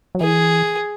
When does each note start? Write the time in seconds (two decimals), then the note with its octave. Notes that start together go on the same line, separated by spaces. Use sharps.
0.15 F#3
0.21 E3 G#4